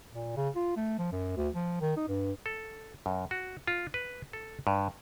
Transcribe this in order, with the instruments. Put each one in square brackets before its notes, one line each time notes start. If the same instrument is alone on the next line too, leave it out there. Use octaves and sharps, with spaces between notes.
[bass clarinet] A#2
C#3
F4
A3
F3
F#2
D2
F3
D#3
D#4
G2
[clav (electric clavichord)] A4
F#2
F#4
F4
B4
A4
G2